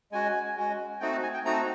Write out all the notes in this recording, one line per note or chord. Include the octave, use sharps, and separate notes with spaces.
G#3 C#4 F#4 G#5
G#3 C#4 F#4
A3 C4 D#4 F#4 G5
A5
G#5
G5
A3 C4 D#4 F#4 A#5
A5